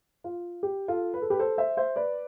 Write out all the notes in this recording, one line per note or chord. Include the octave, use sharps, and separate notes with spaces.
F4
G4
F4 A4
B4
A4
G4 B4
A4 C5
C5 E5
C5 E5
B4 D5